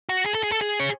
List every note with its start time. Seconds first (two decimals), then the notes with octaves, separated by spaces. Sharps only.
0.09 F#4
0.26 G#4
0.35 A4
0.43 G#4
0.52 A4
0.61 G#4
0.80 C#5